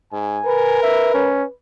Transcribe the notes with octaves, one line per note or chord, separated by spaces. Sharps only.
G#2 G#5
A#4 B4
E5
C#4